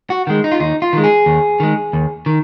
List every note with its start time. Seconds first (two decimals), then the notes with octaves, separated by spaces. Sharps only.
0.10 F#4
0.27 D#3 G#3
0.44 D#4
0.52 F4
0.60 D#2 D#4
0.82 F4
0.93 D#3 G#3
1.04 G#4
1.26 D#2
1.60 D#3 G#3
1.93 D#2
2.26 D#3